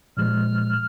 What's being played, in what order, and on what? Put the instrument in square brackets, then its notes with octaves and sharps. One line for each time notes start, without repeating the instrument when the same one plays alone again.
[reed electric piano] A#2 F3 G#3 [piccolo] F6